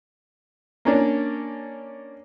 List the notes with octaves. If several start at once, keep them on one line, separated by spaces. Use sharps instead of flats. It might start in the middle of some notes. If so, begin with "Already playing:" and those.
A#3 C#4 D4